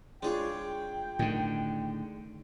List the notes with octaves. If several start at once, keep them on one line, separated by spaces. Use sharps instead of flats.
G#3 D4 F4 G#4 C#5 G5
A2 D3 D#3